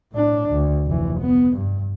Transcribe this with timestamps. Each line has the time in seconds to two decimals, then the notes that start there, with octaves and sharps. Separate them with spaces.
0.13 A2 D4
0.52 D2
0.86 F1 E3
1.20 B3
1.56 G2